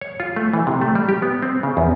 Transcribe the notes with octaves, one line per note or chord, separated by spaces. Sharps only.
C#5
F4
A3
E3
C3
A3
G3
G4
B3
C4
C#3
E2